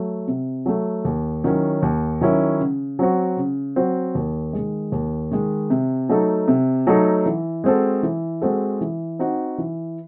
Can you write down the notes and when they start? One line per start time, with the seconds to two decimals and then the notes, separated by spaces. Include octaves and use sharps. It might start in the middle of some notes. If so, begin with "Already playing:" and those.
Already playing: F#3 A3
0.28 C3
0.66 F#3 A3
1.05 D#2
1.44 D#3 F#3 C#4 E4
1.82 D#2
2.21 D#3 F#3 C#4 E4
2.60 C#3
2.99 F#3 C4 F#4
3.37 C#3
3.76 F#3 C4 F#4
4.15 D#2
4.53 D#3 G#3
4.92 D#2
5.31 D#3 G#3
5.70 C3
6.09 F#3 A3 D#4 A4
6.48 C3
6.87 F#3 A3 D#4 A4
7.26 E3
7.64 G#3 C4 F#4 A4
8.03 E3
8.42 G#3 C4 F#4 A4
8.81 E3
9.19 C4 D#4 F#4
9.58 E3